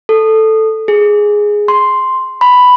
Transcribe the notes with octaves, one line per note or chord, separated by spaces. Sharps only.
A4
G#4
C6
B5